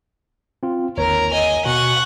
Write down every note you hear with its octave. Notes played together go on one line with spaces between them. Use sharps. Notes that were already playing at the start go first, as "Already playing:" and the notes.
C4 F4
G1 D#2 A#4 C#5 A#5
D#5 G#5
B2 F#4 F#5 G#5 C#6